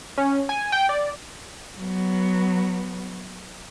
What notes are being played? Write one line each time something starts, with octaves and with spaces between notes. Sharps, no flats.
C#4
G#5
G5
D5
F#3 B3